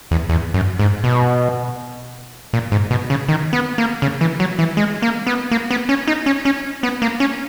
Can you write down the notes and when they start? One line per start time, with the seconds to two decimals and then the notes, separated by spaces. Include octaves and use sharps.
0.11 E2
0.29 E2
0.54 F#2
0.79 G#2
1.04 B2
2.53 A#2
2.72 G#2
2.91 B2
3.10 C#3
3.28 D#3
3.53 B3
3.78 A#3
4.02 C#3
4.21 E3
4.40 F#3
4.59 E3
4.77 G#3
5.02 A#3
5.27 B3
5.51 A#3
5.71 B3
5.89 C#4
6.07 D#4
6.26 C#4
6.45 C#4
6.83 B3
7.02 A#3
7.20 C#4